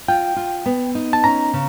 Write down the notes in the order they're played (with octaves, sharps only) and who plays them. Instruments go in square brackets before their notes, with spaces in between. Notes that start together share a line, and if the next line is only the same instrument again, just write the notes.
[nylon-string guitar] F4 [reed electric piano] G5
[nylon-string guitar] F4
B3
D#4
[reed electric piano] A5
[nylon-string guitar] C#4 [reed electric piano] A#5
[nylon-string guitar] C#3